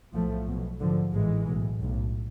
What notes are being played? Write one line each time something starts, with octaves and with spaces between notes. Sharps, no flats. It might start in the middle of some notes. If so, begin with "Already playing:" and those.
B1 A2 F3 A3
B1 B2
G#1 G#2 D3 F3
A1 G#2 E3 G#3
B1 A2
B1 A2